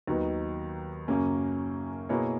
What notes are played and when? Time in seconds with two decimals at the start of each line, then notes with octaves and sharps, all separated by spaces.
0.07 D#2 D#3 F#3 B3 D#4
1.08 F#2 C#3 F#3 A#3 C#4
2.09 B2 A#3 E4 G#4 C#5